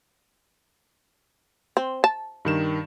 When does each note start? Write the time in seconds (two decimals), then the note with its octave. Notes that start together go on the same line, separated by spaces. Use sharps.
1.77 C4
2.04 A5
2.45 G2 D#3 E7